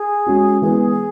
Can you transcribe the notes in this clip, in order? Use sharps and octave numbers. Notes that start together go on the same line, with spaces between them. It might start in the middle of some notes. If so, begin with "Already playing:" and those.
Already playing: G#4
G#3 C#4 F#4
E3 G#3 B3 G#4